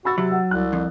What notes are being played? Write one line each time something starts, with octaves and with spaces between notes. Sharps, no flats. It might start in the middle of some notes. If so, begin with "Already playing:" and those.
F#4 B5 E6 A6
C3 F#3
F#5
C2 F#6
F2